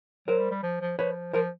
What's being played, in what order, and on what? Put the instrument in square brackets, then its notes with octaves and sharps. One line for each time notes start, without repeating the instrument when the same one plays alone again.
[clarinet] F#3 [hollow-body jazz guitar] A#4 C5
[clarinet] G3
G3
F3
F3
[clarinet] F3 [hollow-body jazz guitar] B4 C#5
[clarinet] F3 [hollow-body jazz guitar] A#4 C5